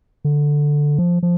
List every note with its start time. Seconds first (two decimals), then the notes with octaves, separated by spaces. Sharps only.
0.25 D3
0.99 F3
1.23 F3